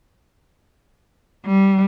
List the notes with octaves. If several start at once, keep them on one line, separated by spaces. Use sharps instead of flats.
G3